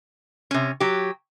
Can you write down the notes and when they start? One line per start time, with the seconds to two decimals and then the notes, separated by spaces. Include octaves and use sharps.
0.51 C3 C#4
0.80 F#3 G4